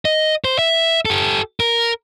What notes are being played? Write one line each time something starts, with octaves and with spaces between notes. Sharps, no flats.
D#5
C5
E5
G4 A4
A#4